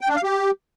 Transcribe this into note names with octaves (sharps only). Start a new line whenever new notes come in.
G5
D4
F5
G4